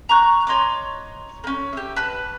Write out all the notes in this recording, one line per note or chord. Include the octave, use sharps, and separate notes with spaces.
A#5 C#6 F#6
C#5 D#5 C6 D6
A#3 C#4
G4 E5
B4 A5 F#6